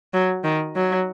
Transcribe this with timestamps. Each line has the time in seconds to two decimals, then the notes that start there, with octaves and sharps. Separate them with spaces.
0.14 F#3
0.44 D#3
0.76 F#3